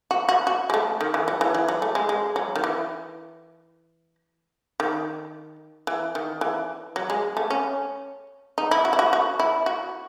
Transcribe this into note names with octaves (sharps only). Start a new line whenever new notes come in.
F#4
F#4
F#4
G#3
A3
D#3
E3
F#3
E3
E3
F#3
A3
G#3
G#3
F#3
D#3
E3
D#3
E3
D#3
E3
F#3
G#3
A3
C#4
D#4
E4
F#4
E4
F#4
F#4
E4
F#4